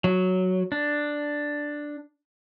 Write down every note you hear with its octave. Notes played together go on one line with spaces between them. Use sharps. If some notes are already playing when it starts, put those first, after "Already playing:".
F#3
D4